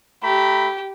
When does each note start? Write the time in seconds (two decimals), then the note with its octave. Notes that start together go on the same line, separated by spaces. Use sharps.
0.23 A3 G4 A#5 B5